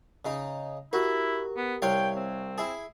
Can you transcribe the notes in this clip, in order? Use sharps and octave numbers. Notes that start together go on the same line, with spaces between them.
C#3 D#4
E4 F#4 G4 A#4
B3
C2 C#5 F5 G5
C4
E4 G#4